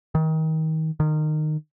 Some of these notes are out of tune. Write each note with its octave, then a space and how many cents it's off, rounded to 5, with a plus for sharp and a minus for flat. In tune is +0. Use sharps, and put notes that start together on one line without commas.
D#3 +30
D#3 -20